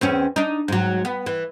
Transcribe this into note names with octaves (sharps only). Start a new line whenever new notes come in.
E2 C4 C#4
D4 D#4
G#2 F#3
B3
E3